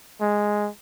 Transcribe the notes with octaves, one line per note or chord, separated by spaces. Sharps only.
G#3